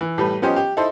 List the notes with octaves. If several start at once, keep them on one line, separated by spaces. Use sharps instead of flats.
E3
A2 G3 B4
F3 B3 C#4 G4 C5 D#5
G4
D#4 E4 A4 C5 D#5